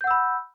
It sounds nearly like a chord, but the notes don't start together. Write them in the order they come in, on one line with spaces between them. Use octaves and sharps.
G6 F#5 E6 B5